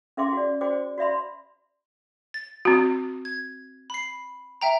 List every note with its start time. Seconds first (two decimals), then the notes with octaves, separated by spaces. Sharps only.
0.17 C#4 G#4 E5 G5 C6 D6
0.33 F#4 D5
0.61 F#4 C5 D5 G5 D6
0.98 F#4 D5 E5 B5 C6
2.34 A6
2.65 C4 F#4
3.25 G#6
3.90 B5 C7
4.61 E5 G5 A#5